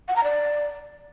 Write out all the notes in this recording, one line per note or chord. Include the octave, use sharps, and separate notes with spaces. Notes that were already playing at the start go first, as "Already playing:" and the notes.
F#5
A#5
D5